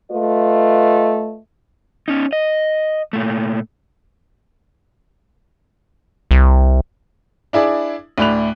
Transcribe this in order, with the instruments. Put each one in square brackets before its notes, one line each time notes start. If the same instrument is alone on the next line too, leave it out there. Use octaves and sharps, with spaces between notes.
[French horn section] A3 F4 B4 D#5
[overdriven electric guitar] C#4 D#4
D#5
A#2 A3
[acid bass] C2
[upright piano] D4 E4 G#4 D5
D2 A2 D4 B5 F#6 F7